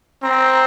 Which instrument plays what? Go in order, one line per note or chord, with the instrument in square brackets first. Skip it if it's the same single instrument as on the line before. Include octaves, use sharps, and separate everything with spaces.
[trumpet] C4 [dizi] A#5